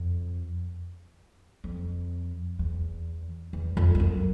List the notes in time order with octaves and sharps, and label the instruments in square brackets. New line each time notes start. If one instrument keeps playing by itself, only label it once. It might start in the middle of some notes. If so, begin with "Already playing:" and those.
Already playing: [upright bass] F2
F2
E2
E2
F2
F2
F#2